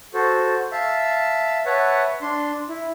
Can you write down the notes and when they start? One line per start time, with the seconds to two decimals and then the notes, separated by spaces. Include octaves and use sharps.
0.14 F#4 A4 C5
0.72 E5 F5 A5 E6
1.66 B4 C#5 E5 F#5 A5
2.22 D4 C6
2.69 E4